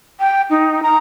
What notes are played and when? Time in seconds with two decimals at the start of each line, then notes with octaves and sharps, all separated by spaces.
0.20 G5
0.50 D#4
0.83 A#5